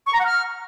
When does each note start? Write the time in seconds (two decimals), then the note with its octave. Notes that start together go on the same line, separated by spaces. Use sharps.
0.07 C#6
0.13 A#5
0.19 F#5
0.26 F6